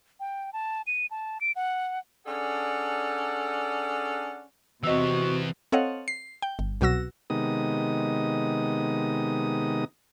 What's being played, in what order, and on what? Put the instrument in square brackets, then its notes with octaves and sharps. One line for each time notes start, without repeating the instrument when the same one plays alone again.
[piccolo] G5
A5
D#7
A5
D7
F#5
[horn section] C#4 D4 G#4 A4 D5 F#5
[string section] C3 [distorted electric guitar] E3 B3 [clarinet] F#4 [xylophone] D#5 E6
[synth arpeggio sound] C4 A4 C#5 D#5 F5 F#5
C7
G5
G1
C2 B2 F#3 F#4 E6 A#6
[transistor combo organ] C3 D#3 G#3 B3 D#4 D#6